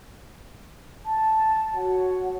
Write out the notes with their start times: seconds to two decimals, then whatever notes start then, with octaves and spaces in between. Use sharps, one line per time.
1.05 A5
1.74 F#4 C#5 F#5